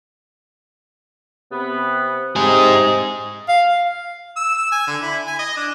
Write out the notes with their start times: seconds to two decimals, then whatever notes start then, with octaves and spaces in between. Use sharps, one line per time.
1.51 C3 B3
2.36 C3 D#4 G#4 D#5
3.49 F5
4.36 E6
4.57 E6
4.72 G#5
4.87 D3
5.02 E4
5.27 G#5
5.39 D#5
5.57 D4